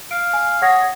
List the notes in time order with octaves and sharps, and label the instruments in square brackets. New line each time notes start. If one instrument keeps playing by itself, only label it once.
[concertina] F5 [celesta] D7
[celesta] G#5
[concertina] G#4 C#5 [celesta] F#5 A#6